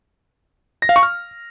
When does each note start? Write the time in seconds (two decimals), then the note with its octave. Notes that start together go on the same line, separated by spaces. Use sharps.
0.82 A#6
0.89 F5
0.96 C#6
1.03 F6